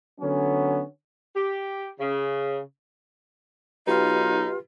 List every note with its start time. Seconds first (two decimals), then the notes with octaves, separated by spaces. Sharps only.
0.21 D3 F#3 B3 C#4
1.35 G4
1.99 C#3
3.87 B1 D#4 F4 G4 B4